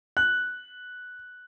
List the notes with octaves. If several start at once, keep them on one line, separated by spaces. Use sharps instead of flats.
F#6